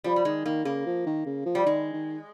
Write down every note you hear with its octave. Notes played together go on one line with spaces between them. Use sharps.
F3 G3
G3
D#3 G#3
D#3 A#3
C#3 A#3
F3
D#3
C#3
F3
G3
D#3 G#3
D#3